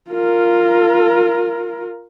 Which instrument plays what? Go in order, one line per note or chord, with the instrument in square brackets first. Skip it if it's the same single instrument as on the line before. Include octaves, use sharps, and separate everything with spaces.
[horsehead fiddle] F4 A#4